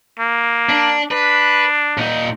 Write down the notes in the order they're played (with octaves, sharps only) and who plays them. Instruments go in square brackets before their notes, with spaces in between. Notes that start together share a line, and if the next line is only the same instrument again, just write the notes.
[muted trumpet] A#3
[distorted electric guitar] D4
[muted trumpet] D4 [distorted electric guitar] B4
[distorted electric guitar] A#2 D#4